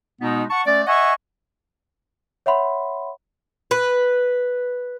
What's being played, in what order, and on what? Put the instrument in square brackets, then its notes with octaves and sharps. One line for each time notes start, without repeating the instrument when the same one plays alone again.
[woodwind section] B2 G#3 B3 D#4
F#5 A5 C#6
A3 C#4 D5
D#5 E5 F#5 G#5 C#6
[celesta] C#5 E5 F#5 B5 C6
[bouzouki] B4